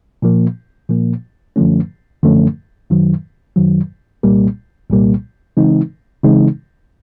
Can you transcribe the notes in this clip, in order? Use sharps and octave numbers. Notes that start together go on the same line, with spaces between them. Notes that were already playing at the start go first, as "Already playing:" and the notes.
A#2 F3 A#3
A#2 F3 A#3
F#2 D3 F3 A3 C#4
F#2 D3 F3 A3 C#4
F#2 D#3 F#3
F#2 D#3 F#3
C2 A#2 G3 A#3
C2 A#2 G3 A#3
C#3 E3 G#3 C4 D#4
C#3 E3 G#3 C4 D#4